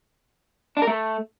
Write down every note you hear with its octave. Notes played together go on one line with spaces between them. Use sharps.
D4
A#4
A3